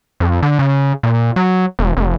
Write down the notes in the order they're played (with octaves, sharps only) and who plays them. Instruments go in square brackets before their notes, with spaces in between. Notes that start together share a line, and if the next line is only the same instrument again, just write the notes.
[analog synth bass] F2
D3
C#3
A#2
F#3
E1
F1